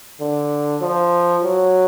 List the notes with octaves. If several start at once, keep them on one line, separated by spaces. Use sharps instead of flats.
D3
F3
F#3